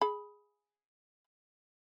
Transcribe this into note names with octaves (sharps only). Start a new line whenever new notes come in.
G#4 B5